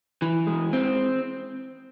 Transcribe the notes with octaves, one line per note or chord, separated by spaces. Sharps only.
E3
G#3
C4